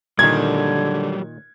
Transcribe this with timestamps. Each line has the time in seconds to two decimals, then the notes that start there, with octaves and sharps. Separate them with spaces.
0.19 A#2 D3 D#3 F#3 G3 G#6